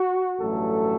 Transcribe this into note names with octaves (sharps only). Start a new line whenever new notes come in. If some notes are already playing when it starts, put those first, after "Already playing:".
Already playing: F#4
A1 G2 F#3 A3 A4